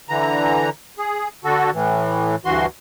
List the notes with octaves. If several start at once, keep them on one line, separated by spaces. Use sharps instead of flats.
D3 E3 A#5
G#4
D3 F#4 A4
A2 E3
D2 G2 E3 F#4 C6